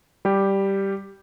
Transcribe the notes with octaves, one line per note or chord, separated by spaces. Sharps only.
G3 G4